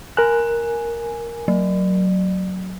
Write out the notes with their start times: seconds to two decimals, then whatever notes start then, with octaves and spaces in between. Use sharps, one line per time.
0.17 A#4 G#5 F#6
1.48 F#3